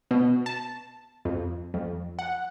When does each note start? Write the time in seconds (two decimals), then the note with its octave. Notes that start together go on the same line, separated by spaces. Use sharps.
0.11 B2
0.46 A5
1.25 F2
1.74 F2
2.19 F#5